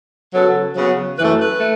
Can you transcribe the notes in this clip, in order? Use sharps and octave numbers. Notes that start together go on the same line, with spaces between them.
C#3 F#3 B3 A4
C#3 F#3 B3
F#2 E3 A3 B4
B4
A3